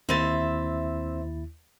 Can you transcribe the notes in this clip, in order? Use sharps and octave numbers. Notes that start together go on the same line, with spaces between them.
D#2 C4 E4 E5 A6